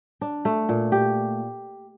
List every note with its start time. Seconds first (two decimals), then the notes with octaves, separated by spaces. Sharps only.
0.21 D4
0.45 A3
0.69 A#2
0.92 G4